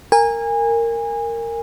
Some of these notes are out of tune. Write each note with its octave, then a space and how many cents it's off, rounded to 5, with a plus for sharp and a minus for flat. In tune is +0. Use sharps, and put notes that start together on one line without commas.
A#4 -15 G#5 -25